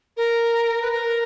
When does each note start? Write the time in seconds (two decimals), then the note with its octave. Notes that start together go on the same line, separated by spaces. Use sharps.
0.16 A#4
0.81 B4
0.91 A#4